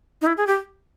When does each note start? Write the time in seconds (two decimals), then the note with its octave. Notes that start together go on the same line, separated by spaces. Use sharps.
0.22 D#4
0.27 E4
0.37 G#4
0.47 G4